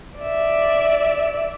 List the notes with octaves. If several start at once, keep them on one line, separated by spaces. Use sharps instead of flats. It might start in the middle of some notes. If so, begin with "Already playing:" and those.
D5 E5